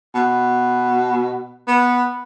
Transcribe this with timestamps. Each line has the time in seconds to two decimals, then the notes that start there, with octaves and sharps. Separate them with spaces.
0.15 B2
1.68 B3